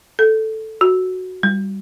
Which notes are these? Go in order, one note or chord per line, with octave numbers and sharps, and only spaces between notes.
A4
F#4
G3